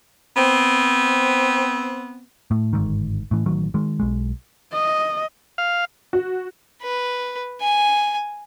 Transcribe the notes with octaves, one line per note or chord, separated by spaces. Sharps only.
B3 C4
A2
G1 G#2 D#3
A2 E3
A1 D#3 F#3
D#3 G#3
B1 G#3
D#5
F5
F#4
B4
G#5